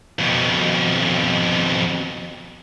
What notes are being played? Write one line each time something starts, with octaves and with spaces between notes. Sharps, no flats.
F2 B2